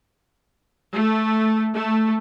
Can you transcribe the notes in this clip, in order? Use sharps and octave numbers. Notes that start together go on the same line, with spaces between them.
A3
A3